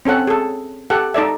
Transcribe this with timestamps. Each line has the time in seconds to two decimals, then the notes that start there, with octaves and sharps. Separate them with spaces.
0.05 C4 C#4 A4 F#5
0.27 G#4 A4
0.90 G4 A4 F#5
1.14 D#4 A4 D5 E5